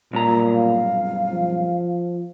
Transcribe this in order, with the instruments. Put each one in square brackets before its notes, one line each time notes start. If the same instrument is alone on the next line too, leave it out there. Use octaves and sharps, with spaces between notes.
[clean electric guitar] B1 G2 A#5 [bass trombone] A#2
[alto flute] F5
[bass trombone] F3